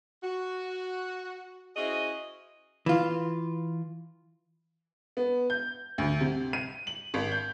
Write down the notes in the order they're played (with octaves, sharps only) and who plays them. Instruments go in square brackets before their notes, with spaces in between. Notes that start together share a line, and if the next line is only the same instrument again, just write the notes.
[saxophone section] F#4
C#4 E4 F#4 G#4 C5 D#5
[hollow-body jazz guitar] E3 F4
[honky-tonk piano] B3
G6
D2
C3
D#7
F#7
G#1
G6